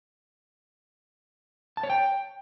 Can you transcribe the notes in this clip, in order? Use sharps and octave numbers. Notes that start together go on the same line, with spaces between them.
A5
C#5
G5